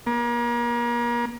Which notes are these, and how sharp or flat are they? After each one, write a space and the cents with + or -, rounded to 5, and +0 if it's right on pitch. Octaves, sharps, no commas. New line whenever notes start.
A#3 +35